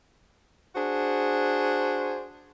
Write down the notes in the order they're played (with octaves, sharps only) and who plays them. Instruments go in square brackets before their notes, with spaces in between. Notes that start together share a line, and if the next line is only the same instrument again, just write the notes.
[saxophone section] D4 F#4 G#4 C5